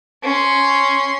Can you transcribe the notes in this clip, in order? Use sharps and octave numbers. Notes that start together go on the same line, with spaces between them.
C#4 C6